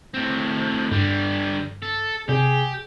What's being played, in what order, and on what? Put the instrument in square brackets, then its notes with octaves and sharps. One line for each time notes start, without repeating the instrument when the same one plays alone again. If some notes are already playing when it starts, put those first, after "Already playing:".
[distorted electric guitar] A2 C4
[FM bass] G2 [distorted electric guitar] D3 G3
[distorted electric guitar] A4
[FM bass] C3 [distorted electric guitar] G4 [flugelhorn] G#4